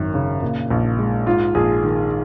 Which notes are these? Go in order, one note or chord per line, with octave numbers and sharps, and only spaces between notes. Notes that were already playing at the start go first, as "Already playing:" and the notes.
Already playing: G#1 F#2 D#3
C#3
A#2
A#1
G#3
G#2 F4
A#1 G#4
D#3